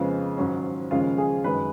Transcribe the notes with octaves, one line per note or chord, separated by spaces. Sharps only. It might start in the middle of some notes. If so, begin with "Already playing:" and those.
Already playing: F2 C#3 G#3 B3 F4
G#2 D#3 F#3 C#4
D#2 C#3 F3 G#3 C#4 F4 F5
G#4 G#5
F#2 D#3 G#3 C#4 B4 B5